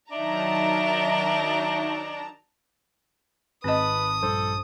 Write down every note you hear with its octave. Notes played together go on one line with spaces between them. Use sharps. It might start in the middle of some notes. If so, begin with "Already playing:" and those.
D#3 F#3 D4 D#4 E5 A5 A#5
G#1 C4 B4 D#5 A5 D#6
A#1 G2 A4 C5